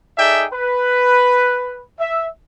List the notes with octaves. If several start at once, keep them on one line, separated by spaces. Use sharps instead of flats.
D#4 G#4 A4 D5 E5 G5
B4
E5